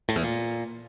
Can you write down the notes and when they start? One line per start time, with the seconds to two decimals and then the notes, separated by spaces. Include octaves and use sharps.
0.09 A2
0.16 E2
0.23 A#2